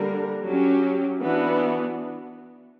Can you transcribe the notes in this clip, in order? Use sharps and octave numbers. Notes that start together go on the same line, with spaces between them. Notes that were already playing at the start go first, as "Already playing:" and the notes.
Already playing: D3 G3 A#3 D4 A#4
F#3 C#4 G4
E3 B3 D4 F#4